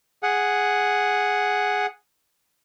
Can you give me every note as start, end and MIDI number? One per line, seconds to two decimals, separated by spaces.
0.23 1.86 68
0.23 1.86 78